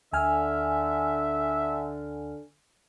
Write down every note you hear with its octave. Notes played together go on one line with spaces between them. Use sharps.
D2 D3 E5 G#5 F6